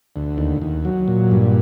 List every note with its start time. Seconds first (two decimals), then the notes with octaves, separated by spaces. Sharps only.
0.16 D2
0.38 D#2
0.62 D#2
0.85 F#3
1.08 A#2
1.31 G2